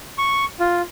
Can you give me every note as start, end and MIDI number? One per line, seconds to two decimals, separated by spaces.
0.18 0.45 85
0.60 0.82 65